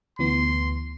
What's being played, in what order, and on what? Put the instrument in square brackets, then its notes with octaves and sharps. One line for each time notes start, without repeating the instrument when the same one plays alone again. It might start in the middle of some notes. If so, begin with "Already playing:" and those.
[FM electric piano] D2 E3 B3 [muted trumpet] C6